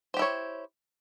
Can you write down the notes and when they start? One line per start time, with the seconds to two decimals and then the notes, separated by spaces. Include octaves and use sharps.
0.14 C5
0.17 G4
0.19 E4
0.22 C#5